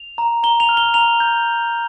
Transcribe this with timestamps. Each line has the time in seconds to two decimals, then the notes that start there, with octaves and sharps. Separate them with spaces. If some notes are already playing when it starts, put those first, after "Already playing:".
Already playing: F7
0.18 A#5
0.43 A#5 G7
0.60 F7
0.69 F6
0.77 G7
0.94 A#5 F7
1.20 G6